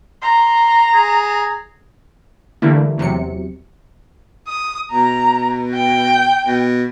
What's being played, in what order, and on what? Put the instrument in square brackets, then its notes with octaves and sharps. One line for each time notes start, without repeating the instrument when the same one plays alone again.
[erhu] A#5 [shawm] C6
[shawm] G#4
[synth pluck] D3 E3 G3 A3 A#3 E4
E2 C3 F#3 C#7
[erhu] D#6
[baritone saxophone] B2 [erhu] A#5
[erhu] G5
[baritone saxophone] B2